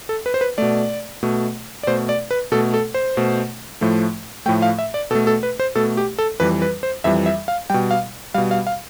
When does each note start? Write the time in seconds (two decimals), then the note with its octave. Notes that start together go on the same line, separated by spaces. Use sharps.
0.09 A4
0.26 B4
0.34 C5
0.41 B4
0.58 B2 A3 D5
1.23 B2 A3
1.83 D5
1.87 B2 A3 C5
2.09 D5
2.31 B4
2.52 B2 A3 A4
2.74 A4
2.94 C5
3.17 B2 A3
3.81 A2 F3 A3
4.46 A2 F3 A3 G5
4.62 F5
4.79 E5
4.94 D5
5.11 B2 A4
5.15 A3
5.27 A4
5.43 B4
5.60 C5
5.75 B2 A3 A4
5.97 G4
6.18 A4
6.40 F2 E3 G3 B4
6.62 B4
6.83 C5
7.04 F2 E3 G3 E5
7.26 E5
7.48 F5
7.70 B2 G3 G5
7.91 F5
8.34 B2 G3 F5
8.51 F5
8.67 F5